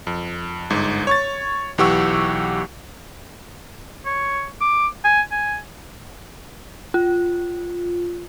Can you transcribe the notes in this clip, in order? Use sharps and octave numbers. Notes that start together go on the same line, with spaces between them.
F2
G1 G#2
C#5 C#6 A6
B1 E3 G4 F#5 C#6 E6
C#5
D6
G#5
G#5
F4